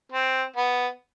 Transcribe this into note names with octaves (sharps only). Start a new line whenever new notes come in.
C4
B3